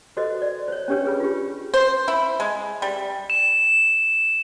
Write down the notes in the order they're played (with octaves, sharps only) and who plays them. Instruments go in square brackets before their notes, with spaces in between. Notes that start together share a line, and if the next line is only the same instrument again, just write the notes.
[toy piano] F#4 A4 B4 C5 D#5
D5
C5 C#5
C#4 D4 G4 B4 C#5
G#4 B4 B5
F4 G4
[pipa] C5
E4
G#3
G3
[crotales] E7